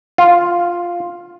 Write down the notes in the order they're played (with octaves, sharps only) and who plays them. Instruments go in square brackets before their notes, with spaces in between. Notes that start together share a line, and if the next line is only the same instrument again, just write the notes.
[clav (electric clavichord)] F4